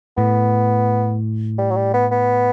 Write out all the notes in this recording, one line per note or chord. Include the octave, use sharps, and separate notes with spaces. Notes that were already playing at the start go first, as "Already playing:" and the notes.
A2 B3
G3
F#3
G3
B3
B3